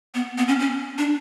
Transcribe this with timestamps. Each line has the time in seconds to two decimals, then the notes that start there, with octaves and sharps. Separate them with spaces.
0.14 B3
0.38 B3
0.48 C#4
0.60 C#4
0.98 D4